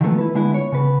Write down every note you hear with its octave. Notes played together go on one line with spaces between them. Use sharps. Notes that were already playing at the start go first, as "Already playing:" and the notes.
D#3 F3 F#3 G#3 A3 B3
E4 B4
D3 G#3 B3 E4
C#5
C#3 B3 B4